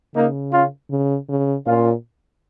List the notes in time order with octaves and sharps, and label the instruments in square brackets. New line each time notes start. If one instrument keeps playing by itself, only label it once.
[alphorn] C#3 [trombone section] A#3 D#4
[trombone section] C#4 F4
[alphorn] C#3
C#3
[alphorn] A#2 [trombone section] C#4 F4